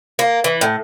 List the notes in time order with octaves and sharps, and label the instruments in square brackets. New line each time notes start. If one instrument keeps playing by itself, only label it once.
[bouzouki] A#3
E3
A2